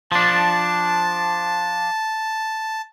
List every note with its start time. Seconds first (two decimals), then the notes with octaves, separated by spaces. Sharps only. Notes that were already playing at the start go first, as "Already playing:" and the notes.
0.12 F3 D4 A5